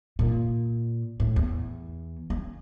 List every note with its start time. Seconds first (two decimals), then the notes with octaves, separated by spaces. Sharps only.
0.19 A#2
1.20 A2
1.36 E2
2.30 C#4